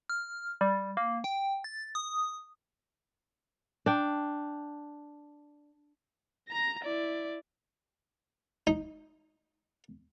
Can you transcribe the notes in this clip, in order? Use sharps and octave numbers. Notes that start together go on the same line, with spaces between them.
F6
G3
A#3
G5
A6
D#6
D4 G5
A#5 A#6
E4 D5
D#4